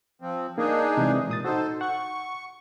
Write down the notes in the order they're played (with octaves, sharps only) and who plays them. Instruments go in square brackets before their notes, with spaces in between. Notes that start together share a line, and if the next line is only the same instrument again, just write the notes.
[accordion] F3 C4
[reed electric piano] A#3 [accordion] D4 D#4 G#4
[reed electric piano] C3 E3 G#3
A#2 D#6 A6
[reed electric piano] D#4 F#4 [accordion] A4 C5
[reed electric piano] F#5 [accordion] C#6